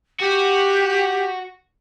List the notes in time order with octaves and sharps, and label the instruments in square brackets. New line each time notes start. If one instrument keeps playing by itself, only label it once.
[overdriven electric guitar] F#4 [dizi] G4